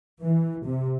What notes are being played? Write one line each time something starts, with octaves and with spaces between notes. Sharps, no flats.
E3
C3